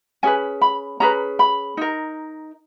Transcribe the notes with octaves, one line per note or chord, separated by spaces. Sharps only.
C#4 G#4 B4 G#5
B5
C#4 G#4 B4 A#5
B5
D#4 A#4